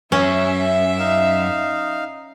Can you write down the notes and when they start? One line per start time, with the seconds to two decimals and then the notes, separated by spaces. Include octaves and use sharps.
0.12 F#2 C#4 E5
0.99 D#4 F5